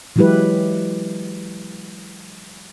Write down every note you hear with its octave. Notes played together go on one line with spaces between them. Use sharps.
E3 F#3 G#3 E4 G4 B4